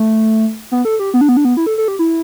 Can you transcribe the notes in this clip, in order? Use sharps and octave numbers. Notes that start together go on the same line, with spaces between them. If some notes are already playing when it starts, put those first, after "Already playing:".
Already playing: A3
B3
A4
G4
B3
D4
B3
D4
B3
E4
A4
A4
G4
E4